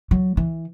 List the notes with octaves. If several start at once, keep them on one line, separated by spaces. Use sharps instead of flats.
F#3
E3